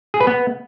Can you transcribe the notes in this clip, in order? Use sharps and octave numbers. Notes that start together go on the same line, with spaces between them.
G#4
B4
B3